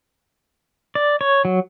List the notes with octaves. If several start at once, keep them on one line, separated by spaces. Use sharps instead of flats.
D5
C#5
F#3